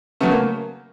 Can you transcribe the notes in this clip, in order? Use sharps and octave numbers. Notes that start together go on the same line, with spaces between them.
C#3 F#3 A3 B3
A#3